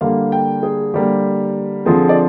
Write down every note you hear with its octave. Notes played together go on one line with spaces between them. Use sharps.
D3 G3 A#3 F5
G5
G#4
D3 G3 A#3 G4
D3 F3 C4 G#4
D5